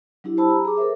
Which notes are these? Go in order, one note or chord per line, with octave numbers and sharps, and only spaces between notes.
F#3 D4 E4 G4
G4 C5 A5 B5 E6
A#5
G#4 D6
A4 A#4 C5 E5